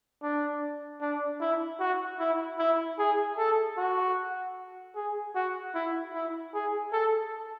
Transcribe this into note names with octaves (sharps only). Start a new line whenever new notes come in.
D4
D4
E4
F#4
E4
E4
G#4
A4
F#4
G#4
F#4
E4
E4
G#4
A4